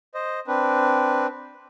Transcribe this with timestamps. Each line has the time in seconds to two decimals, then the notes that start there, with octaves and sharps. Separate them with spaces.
0.14 C5 D#5
0.47 C4 D4 B4